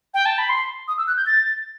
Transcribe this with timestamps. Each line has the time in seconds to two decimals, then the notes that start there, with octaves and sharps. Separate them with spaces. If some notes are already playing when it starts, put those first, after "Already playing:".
0.14 G5
0.26 A5
0.38 B5
0.49 C6
0.88 D#6
0.98 E6
1.07 F#6
1.17 G6
1.27 A6